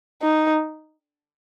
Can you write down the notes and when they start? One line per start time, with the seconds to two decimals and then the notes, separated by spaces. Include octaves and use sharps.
0.22 D#4